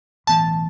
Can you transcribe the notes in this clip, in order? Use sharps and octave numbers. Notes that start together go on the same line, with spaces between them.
B1 A2 E3 B3 A5